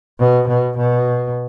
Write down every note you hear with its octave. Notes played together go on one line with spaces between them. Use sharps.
B2
B2
B2